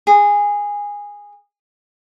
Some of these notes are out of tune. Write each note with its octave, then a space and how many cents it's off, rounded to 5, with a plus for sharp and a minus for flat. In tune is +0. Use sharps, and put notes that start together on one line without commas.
G#4 -15